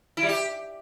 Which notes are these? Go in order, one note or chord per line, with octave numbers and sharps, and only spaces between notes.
E4
G3
G4